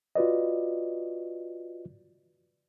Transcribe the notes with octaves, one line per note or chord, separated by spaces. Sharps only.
F4 F#4 B4 D5 D#5